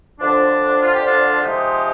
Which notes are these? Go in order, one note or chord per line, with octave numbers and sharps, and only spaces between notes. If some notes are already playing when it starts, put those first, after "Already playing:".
F2 D3 F3 D4
F4
G4
D4 F4
C3 F3 G#3 D#4 G4